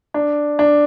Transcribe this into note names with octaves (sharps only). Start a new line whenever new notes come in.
D4
D4